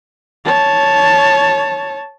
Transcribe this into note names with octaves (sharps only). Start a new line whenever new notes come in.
C#5 A5